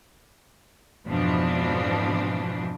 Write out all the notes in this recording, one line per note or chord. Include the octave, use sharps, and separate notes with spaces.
F2 G#2 B2 E3 F3 D4